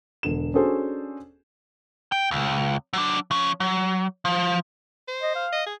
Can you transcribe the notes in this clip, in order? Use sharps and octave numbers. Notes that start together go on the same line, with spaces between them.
E1 D3 E7
C#4 D4 F#4 G#4 A4 C5
G5
C#2
F#3 D4
F3 C#4
F#3
F3
C5
D#5
F5
D#5
G#4